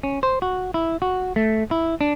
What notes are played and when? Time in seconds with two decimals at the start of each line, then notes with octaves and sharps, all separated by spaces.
0.03 C#4
0.23 C5
0.42 F#4
0.74 E4
1.02 F#4
1.36 A3
1.71 E4
2.01 D4